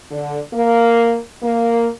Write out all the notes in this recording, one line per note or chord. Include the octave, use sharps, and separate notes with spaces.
D3
A#3
A#3